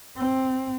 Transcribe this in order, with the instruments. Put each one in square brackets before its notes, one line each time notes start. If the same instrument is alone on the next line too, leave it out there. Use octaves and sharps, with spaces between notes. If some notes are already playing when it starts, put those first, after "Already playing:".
[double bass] C4